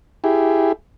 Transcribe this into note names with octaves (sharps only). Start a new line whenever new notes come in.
E4 G4 G#4